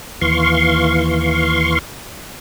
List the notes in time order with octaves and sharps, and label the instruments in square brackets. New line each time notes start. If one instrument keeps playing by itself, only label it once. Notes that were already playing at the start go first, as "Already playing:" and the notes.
[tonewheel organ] D#2 E3 F5 C6 C#6